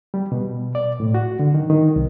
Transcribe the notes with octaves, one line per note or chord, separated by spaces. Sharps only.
G3
B2
D5
A2
F#4
D3
D#3
D#3
C2